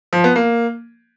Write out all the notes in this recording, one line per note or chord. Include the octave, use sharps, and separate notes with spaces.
F3
B3
A#3